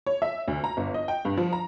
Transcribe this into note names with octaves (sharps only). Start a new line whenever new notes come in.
C#5
E5
D2
A#5
G1
D#5
G5
G2
F3
A#5